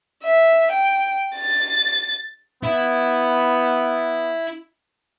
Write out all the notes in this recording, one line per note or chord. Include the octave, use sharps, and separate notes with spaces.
E5
G5
A6
B3 E4